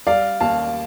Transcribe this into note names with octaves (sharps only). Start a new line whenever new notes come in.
G3 D5 F5
D#2 F5 A5